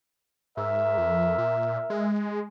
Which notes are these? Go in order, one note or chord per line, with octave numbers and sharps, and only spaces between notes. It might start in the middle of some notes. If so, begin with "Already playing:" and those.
G#2 A#4 E5
F2
A#2
G#3